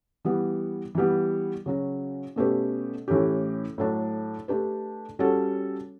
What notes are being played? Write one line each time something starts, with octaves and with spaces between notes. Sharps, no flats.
E3 G3 B3
E3 G3 B3
C#3 F#3 C#4 F#4
B2 A3 C#4 G4 B4
A2 E3 A3 C#4 G4
A2 F#3 A3 D4
A3 D4 G4 B4
G3 C#4 F#4 A4 C#5